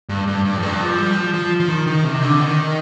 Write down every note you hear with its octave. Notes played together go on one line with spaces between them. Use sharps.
G2
G2
G2
F2
G2
F3
G3
F3
F3
F3
D#3
D#3
C3
D3
D#3